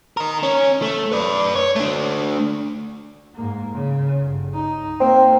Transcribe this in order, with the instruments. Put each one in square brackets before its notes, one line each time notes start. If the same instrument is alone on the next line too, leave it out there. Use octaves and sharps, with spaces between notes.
[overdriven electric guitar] D#4 A#4
C#4
A3
B4 D5
C#5
A3 D4
[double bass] G#2 A#3
C#3
G1
D#4
[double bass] A#3 [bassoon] C4